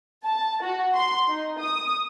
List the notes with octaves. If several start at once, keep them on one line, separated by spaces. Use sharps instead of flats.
A5
F#4
C6
D#4
D#6